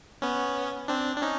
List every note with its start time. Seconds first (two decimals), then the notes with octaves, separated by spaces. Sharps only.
0.22 B3 C#4
0.88 C4 D4
1.16 D4
1.22 C#4 D#4